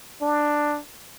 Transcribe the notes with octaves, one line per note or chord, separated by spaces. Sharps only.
D4